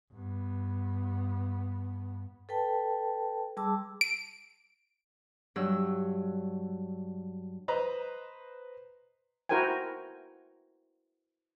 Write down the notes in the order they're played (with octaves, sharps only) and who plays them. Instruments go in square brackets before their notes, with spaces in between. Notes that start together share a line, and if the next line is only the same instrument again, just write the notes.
[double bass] G2 B3
[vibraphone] A4 B4 G5 A5
G3 G#4 A5 C6 D6 E6
[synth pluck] D7
[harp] G2 F#3 E6
[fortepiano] B4 C5 D#5 A#5
[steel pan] E4 F#4 A#4 C5 G5 G#5